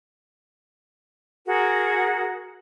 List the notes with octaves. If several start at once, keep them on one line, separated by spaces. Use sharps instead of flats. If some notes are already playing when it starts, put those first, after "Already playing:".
F#4 G#4 A#4